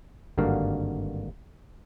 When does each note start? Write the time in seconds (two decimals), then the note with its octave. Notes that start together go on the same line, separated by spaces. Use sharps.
0.38 G#1 G2 D3 A#3 F#4 F5